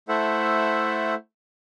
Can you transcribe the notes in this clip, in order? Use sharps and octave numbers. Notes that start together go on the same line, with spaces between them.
A3 E4 A4 C5 E5 F#5